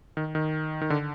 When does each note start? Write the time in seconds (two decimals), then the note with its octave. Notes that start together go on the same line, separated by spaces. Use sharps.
0.17 D#3
0.35 D#3
0.81 D#3
0.90 D3